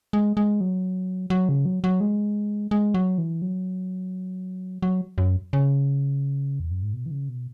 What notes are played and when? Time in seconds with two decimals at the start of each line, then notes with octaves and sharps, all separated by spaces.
0.13 G#3
0.37 G#3
0.61 F#3
1.30 F#3
1.49 C#3
1.66 F#3
1.84 F#3
2.01 G#3
2.71 G#3
2.94 F#3
3.18 E3
3.42 F#3
4.82 F#3
5.18 F#2
5.53 C#3
6.60 E2
6.71 F#2
6.82 G#2
6.93 B2
7.06 E3
7.11 C#3
7.29 B2